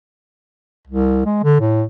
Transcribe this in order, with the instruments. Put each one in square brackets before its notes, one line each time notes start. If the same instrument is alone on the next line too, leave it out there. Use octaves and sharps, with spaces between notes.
[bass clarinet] C2
G#3
D3
A2